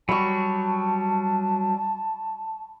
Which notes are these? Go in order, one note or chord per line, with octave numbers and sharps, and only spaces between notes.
F#3 G3 A5 B5 C#6